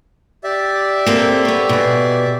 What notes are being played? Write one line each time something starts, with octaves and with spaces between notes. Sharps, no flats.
G4 D5 E5
A#3 C4 A4
B3 C#5
B2 G#4